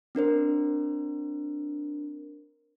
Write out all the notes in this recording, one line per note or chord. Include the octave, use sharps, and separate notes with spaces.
C4 D4 A#4 C5